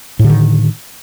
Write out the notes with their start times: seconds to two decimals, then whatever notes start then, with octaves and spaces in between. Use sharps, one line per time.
0.19 A2
0.24 D3
0.29 D#3